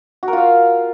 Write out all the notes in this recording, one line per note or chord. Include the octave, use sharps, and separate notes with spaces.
F#4
A#4
F4
F5